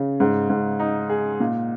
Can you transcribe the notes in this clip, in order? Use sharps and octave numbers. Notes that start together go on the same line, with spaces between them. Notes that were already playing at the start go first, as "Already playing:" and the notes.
Already playing: C#3
G#2
G#2
D#4
G#4
A#2